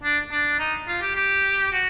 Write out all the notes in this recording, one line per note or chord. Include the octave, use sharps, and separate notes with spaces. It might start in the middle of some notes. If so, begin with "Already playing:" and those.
D4
D4
D#4
F4
G4
G4
F#4